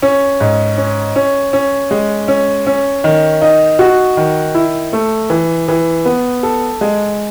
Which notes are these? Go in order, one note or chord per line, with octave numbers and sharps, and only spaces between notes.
C#4
G#2
C#4
C#4
C#4
G#3
C#4
C#4
D#3
D#4
F#4
D#3
E4
A3
E3
E3
B3
A4
G#3